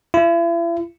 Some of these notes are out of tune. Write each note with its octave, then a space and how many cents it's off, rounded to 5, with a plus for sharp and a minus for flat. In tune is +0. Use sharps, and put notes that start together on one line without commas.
E4 +40